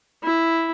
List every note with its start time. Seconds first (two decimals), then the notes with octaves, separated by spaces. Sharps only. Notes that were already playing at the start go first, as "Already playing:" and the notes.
0.23 E4